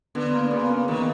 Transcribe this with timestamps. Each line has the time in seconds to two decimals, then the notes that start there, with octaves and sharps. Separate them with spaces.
0.15 D3 B3
0.33 A#3
0.51 C#3 B3
0.70 A#3
0.88 D#3 B3